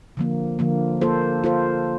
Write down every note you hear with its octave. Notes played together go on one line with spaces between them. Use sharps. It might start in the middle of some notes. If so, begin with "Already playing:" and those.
D3 F3 A#3
D3 F3 A#3
A#3 F4 A4 C5
A#3 F4 A4 C5